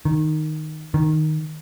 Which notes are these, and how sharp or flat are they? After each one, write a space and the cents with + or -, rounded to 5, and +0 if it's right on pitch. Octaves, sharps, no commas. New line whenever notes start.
D#3 -5
D#3 -5